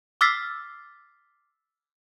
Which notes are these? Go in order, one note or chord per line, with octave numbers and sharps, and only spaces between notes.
D6 E6 F6 A6 B6 C7